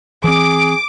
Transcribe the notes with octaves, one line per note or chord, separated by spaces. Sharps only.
E3 C4 G#4 D6